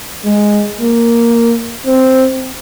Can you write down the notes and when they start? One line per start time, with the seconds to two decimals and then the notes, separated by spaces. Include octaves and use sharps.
0.25 G#3
0.80 A#3
1.87 C4